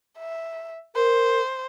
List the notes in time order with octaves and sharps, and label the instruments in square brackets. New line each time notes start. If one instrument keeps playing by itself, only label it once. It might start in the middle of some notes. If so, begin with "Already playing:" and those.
[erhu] E5
[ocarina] A#4 [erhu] C5